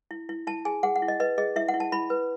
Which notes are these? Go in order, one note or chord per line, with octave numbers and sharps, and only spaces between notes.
E4
E4
E4 A5
G#4 G#5
G#4 F#5
F#5
E4
D#5
B4 D#5
G#4 D#5
E4 E5
F#5
E4
A5
E4 B5
B4